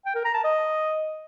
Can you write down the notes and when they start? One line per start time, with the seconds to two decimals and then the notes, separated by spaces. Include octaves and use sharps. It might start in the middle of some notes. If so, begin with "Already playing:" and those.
0.06 G5
0.15 A#4
0.25 A#5
0.34 A5
0.44 D#5